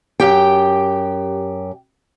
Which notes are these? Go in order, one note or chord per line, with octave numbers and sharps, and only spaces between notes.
F#2 G4 G5